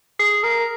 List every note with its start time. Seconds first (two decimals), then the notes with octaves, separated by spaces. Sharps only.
0.19 G#4
0.44 A#4